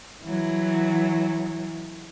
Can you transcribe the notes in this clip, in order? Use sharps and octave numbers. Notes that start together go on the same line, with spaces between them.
E3 F#3